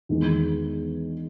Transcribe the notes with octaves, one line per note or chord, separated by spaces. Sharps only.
E2 D#3 G#3